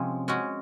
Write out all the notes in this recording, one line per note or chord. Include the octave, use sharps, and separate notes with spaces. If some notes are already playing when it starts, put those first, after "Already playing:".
Already playing: C3 F3 G#3 C#4
G#3 C#4 F#4